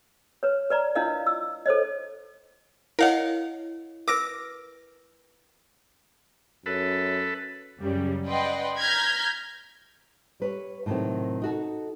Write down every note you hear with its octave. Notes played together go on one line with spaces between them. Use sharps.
B4 C#5
B4 D5 A#5
D4 E4 F4 A#4 D#5 F5
E6
A4 C5 C#5 D#5
E4 A#4 C#5 D#5 F5 F#5
A#4 B4 D6 A#6 D7
F#2 A4 B4
F#2 C#3 G3
B4 D5 D#5 F#5 G5 C6
A#5 F6 G6 G#6 A#6 B6
G3 B4 C#5
A2 C3 D#3 F#3 C4
D#4 F#4 A4